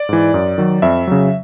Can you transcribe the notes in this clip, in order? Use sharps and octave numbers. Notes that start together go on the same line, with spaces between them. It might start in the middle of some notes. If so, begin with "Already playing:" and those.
Already playing: D5
G#2 E3
F#2
D#3 F#3
F2 E5
C#3 F#3